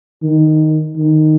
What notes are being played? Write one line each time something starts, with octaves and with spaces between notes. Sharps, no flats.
D#3
D#3